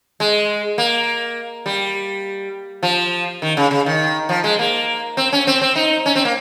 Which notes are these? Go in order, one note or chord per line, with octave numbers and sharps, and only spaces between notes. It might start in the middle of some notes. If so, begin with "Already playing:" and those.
G#3
A#3
G3
F3
D#3
C#3
C#3
D#3
F3
G#3
A#3
C4
C#4
C4
C4
D#4
C#4
C4
A#3